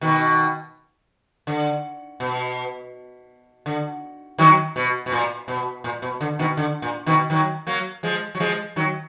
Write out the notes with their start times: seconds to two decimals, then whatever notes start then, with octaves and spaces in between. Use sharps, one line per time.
0.01 B2 D#3
1.47 D3
2.20 B2
3.66 D3
4.38 D#3 F#3
4.76 B2
5.06 B2
5.12 A#2
5.48 B2
5.84 A#2
6.02 B2
6.21 D3
6.39 B2 D#3
6.57 D3
6.82 A#2
7.06 B2 D#3
7.30 D#3 F#3
7.67 F#3 A#3
8.03 F3 G#3
8.35 F#3
8.40 F3 G#3
8.76 D#3 F#3